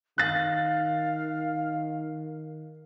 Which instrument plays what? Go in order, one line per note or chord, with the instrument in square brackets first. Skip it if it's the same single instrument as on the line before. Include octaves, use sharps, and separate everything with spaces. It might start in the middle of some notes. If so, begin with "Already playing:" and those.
[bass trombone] D#3 [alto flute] F5 [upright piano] F#6 A6